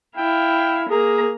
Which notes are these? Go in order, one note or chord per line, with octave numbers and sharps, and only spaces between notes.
E4 F5 G5
A#3 G#4 A#5